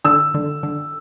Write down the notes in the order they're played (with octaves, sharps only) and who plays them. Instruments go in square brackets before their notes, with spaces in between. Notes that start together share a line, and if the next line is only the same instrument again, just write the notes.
[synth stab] D3 [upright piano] E6
[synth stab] D3
D3